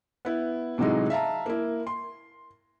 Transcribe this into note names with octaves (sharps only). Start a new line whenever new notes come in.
B3 E4
A2 C3 E3 F#3 G#3 D#4
E5 F5 A5 A#5
A#3 E4
C6